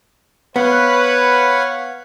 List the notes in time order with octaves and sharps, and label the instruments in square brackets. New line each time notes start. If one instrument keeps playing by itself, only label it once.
[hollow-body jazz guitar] B3 [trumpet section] B4 [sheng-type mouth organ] C#5 F5 F#5